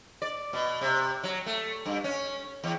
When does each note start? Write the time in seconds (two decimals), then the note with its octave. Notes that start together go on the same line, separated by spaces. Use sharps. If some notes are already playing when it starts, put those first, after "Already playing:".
0.22 D5
0.53 B2
0.81 C3
1.23 F#3
1.46 A3
1.86 G2
2.04 C#4
2.64 E2